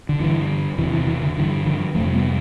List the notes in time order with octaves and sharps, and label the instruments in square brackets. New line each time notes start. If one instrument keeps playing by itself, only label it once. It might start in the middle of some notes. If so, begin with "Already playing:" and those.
[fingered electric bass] D3
G2 D3 E3
E2 C3 E3
E3
E3
D3
G2 D3 E3
D3 F3
F2 C3 F3 A3
G3 B3